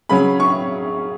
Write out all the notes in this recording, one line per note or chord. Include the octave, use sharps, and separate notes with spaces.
C#3 F#3 C#4 B5
C#6